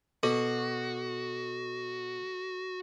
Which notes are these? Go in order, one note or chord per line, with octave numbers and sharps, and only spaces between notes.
B2 F#4 A4